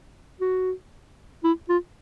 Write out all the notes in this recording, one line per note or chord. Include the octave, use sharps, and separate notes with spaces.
F#4
E4
F4